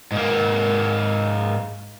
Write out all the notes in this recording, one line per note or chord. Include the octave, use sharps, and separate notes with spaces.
G#2 A#3